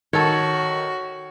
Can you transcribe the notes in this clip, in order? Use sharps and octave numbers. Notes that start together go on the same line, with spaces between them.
D#3 F#4 A4 C#5